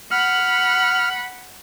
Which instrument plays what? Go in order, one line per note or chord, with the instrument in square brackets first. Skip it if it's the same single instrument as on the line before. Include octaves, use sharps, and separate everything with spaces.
[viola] F#5 B5 [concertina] F6